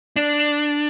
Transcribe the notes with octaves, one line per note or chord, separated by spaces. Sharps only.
D4